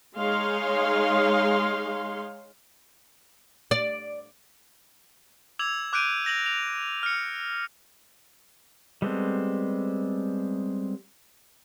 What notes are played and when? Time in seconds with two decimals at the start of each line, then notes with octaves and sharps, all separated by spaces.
0.18 G#3 D#4 G#4 C#5 F5 C6
3.71 D5
5.59 D6 E6 G#6 F7 F#7
5.93 D6 F#6 G6 D7 D#7
6.25 G6 A#6 F7 F#7
6.46 F7
7.03 F6 C#7
9.02 G3 G#3 B3 C4 A4